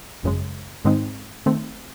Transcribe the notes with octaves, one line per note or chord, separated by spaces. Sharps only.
G#1 F#2 C#3 G#3
G#2 D#3 G#3 C4 D#4
D#3 A3 C4